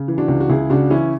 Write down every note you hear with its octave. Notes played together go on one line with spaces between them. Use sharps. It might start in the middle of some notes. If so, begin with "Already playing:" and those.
Already playing: C#3
E3
D4 F#4
C#2
F#4
C#2 E4 G#4
C#3 D4 F#4
E3 C#4 E4